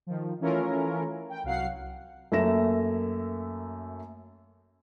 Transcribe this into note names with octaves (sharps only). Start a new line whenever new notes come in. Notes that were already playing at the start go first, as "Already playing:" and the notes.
D#3 F3
E3 A3 C#4 E4 F4 A#4
G5
C2 F#3 F5 F#5 C7
F#2 A3 A#3 E5 A#6 E7